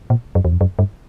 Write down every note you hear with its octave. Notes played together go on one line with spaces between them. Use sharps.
A#2
F#2
E2
F2
F#2
G2